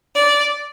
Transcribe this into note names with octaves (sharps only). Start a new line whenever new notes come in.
D5